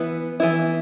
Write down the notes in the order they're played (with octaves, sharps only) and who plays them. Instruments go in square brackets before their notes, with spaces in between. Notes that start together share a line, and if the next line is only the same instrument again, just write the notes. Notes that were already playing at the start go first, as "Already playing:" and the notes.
Already playing: [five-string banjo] E3 B3 E4
E3 B3 E4